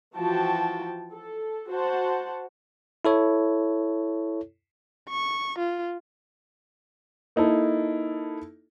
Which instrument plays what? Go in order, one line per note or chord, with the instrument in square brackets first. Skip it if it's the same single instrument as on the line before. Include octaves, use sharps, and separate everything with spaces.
[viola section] E3 F3 F#4 G5 A5
A4
F#4 C5 F#5 A5
[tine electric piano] E4 A4 C#5
[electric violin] C#6
F4
[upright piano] A#3 D#4 E4 A4